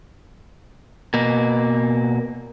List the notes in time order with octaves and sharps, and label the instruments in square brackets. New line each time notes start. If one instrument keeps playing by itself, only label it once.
[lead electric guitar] B2 A#3